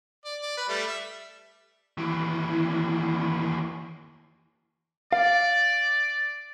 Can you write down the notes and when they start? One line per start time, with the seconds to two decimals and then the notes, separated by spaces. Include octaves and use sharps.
0.25 D5
0.42 D5
0.57 B4
0.69 G3 A3
0.87 E5
1.98 D#2 E3
5.12 D5 F5